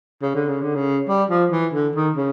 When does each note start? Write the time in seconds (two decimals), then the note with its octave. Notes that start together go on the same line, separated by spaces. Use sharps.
0.22 C#3
0.35 D3
0.48 C#3
0.62 D3
0.75 C#3
1.08 G3
1.30 F3
1.51 E3
1.73 D3
1.95 D#3
2.16 C#3